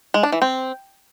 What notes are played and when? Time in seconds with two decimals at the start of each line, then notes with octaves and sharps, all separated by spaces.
0.14 G#3
0.23 D4
0.32 E3
0.42 C4